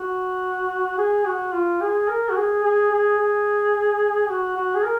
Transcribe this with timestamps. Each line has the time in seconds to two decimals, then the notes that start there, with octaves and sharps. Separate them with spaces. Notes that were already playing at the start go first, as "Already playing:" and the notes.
Already playing: F#4
0.98 G#4
1.26 F#4
1.53 F4
1.81 G#4
2.09 A#4
2.29 F#4
2.36 G#4
2.63 G#4
2.91 G#4
3.18 G#4
4.30 F#4
4.57 F#4
4.75 G#4
4.84 A#4